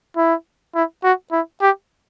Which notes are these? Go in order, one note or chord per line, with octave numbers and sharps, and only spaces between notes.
E4
E4
F#4
E4
G4